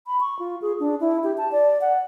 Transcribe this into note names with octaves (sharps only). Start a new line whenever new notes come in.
B5
C#6
F4
G#4
D4
E4
G4
A5
D5
F#5